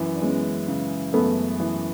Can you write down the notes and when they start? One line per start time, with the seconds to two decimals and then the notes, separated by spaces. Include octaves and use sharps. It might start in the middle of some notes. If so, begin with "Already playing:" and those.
Already playing: F#2 E3
0.16 D4
0.22 G#3 B3 C#4
0.68 C#3
1.13 F#2 A3 B3
1.60 E3